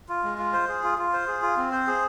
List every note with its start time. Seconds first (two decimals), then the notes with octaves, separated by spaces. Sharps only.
0.09 F4
0.24 G#3
0.38 F4
0.53 C5
0.68 G#4
0.83 F4
0.98 F4
1.13 C5
1.28 G#4
1.42 F4
1.57 C4
1.72 C5
1.87 G#4